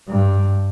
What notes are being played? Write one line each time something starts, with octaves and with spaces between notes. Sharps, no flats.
G2